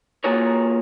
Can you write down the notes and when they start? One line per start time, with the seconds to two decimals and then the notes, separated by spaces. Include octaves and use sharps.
0.24 A#3 F4 F#4 G#4 A#4 C#5